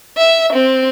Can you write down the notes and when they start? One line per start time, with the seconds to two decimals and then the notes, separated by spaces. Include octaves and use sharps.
0.18 E5
0.53 C4